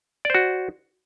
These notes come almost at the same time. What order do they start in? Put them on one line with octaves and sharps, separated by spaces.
D5 C5 F#4